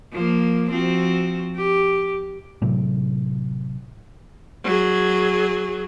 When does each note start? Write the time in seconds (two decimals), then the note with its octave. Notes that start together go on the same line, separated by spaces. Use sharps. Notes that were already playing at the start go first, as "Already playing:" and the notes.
0.13 F3 A#3
0.70 F3 C4 F#4
1.56 G4
2.62 A2 C3 F#3
4.64 F#3 G#4